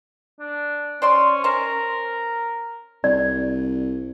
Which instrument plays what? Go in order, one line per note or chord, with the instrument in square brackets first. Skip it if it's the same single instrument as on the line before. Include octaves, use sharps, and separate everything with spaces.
[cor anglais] D4
[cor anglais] C#4 [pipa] C5 D5 C6
[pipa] C#4 C5 [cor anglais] A#4
[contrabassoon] C2 [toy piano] D5